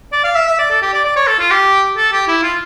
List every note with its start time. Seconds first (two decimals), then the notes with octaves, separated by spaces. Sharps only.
0.12 D5
0.24 F5
0.36 E5
0.47 E5
0.59 D5
0.70 A4
0.82 G4
0.94 D5
1.05 D5
1.16 C#5
1.27 A4
1.39 F4
1.51 G4
1.97 A4
2.13 G4
2.28 E4
2.43 F4